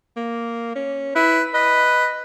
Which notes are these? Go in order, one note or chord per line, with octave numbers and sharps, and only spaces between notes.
A#3
C#4
E4 B4
B4 D#5